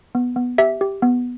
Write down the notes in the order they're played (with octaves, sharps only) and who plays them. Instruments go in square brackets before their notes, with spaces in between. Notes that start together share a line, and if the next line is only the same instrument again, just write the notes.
[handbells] B3
B3
G4 E5
G4
B3